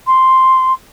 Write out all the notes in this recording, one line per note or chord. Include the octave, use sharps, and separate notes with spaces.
C6